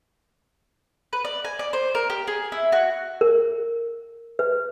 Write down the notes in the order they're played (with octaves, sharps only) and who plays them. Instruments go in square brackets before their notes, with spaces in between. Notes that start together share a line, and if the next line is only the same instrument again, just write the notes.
[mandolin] B4
D5
G#5
D5
C5
A#4
G4
G#4
E4
F#4
[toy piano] A#4
B4